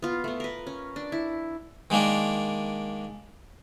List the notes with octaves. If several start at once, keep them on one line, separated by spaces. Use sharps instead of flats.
B3 F4
A3 B3
A#4 B4
C#4
D4
E4
D#3 G#3 A#3 D4 D5